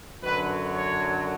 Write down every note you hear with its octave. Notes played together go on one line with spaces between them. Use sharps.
F#2 D3 F#3 B4
C#5